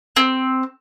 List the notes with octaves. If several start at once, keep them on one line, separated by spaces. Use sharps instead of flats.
C4